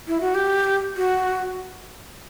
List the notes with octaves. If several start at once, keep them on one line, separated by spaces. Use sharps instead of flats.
E4
F#4
G4
F#4